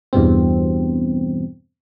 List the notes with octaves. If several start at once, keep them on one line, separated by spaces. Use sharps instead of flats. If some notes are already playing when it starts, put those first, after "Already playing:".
E2 G2 B2 C4